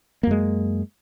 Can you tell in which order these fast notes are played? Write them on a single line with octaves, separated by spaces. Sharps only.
A#3 F#2 G#3